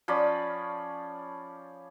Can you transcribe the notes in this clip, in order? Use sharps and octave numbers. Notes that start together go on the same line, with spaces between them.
F3 C#4 D5 B5